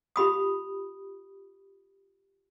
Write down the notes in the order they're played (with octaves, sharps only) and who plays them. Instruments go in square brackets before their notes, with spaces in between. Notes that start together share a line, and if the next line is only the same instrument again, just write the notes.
[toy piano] F4 G4 B5 D#6